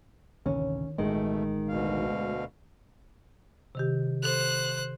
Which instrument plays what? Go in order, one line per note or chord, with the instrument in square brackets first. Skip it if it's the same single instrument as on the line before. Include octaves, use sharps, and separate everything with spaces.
[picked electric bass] A1 D2 C3 [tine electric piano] D#3 [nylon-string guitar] C#4
[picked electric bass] A1 [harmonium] B2 A3 [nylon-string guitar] D#3 [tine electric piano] G#3
[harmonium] D2 B2 F5
[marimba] C3 D#3 G4
[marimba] A4 [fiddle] C5 F#6